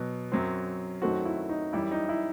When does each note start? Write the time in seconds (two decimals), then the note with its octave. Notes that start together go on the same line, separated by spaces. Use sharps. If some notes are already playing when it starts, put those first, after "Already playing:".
Already playing: B2 F#3 B3
0.32 F#2 F#3 C4
1.02 F#2 D#3 F#3 A3 C4 F#4
1.25 E4
1.49 D#4
1.73 F#2 E3 G3 E4
1.91 D#4
2.09 E4